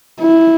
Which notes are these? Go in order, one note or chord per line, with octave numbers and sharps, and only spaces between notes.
E4